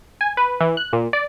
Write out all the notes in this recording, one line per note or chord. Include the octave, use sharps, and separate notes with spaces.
G#5
B4
E3
F#6
A#2
D5